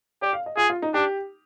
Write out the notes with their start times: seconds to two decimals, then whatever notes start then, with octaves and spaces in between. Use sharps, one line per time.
0.22 G4 D5
0.33 F5
0.46 D#5
0.57 F4 G#4
0.70 F4
0.82 D#4
0.94 D4 G4